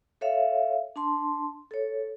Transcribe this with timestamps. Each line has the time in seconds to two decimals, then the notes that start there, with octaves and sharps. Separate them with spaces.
0.21 A4 C#5 E5 F5
0.96 D4 A5 C6
1.71 A4 C#5